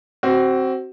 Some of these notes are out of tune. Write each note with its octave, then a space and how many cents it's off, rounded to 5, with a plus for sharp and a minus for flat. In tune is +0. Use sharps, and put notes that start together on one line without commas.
C4 +10 F#4 +30